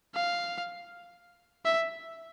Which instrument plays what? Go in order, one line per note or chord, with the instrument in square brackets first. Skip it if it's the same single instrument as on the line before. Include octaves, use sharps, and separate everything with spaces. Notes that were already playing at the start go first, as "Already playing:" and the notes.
[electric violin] F5
E5